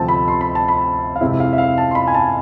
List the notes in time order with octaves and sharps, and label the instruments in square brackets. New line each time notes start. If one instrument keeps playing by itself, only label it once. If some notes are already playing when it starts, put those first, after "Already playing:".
Already playing: [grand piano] D2 C3 F3 A3 C4 A5
B5
C6
B5
A5
B5
F5
F2 C3 G#3 C4 E4 E5
F5
E5
F5
A5
C6
B5
G#5
A5